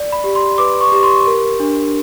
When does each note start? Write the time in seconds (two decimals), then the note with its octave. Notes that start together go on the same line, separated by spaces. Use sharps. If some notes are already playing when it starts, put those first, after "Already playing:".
Already playing: D5
0.12 B5
0.24 G4
0.35 C6
0.58 B4 D6
0.81 C#6
0.92 G4
1.03 C6
1.26 A#4
1.60 D4